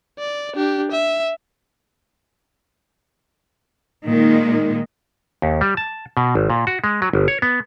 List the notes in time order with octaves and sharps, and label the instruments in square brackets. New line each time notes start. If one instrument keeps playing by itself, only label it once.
[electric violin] D5
D4 G4
E5
[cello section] A#2 D#3 G#3 A#3
[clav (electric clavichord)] D#2
G3
A5
B2
G#1
A#2
F#4
G#3
F#3
G1
C#5
B3